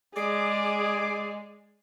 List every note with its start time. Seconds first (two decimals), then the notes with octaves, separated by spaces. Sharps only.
0.16 G#3 G#4 D5 D6